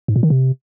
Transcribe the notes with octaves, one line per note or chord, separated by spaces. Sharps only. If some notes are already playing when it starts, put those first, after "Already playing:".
G#2
A#2
D#3
C3